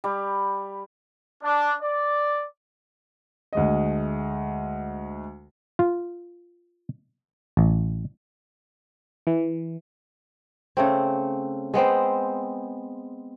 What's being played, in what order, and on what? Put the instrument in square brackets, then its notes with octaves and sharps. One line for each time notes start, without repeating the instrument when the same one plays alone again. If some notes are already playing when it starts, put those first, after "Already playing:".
[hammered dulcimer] G3
[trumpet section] D4
D5
[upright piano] D2 G#3 D#5
[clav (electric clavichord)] F4
A1
[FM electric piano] E3
[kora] C#3 A3 C4
G#3 B3 C4 C5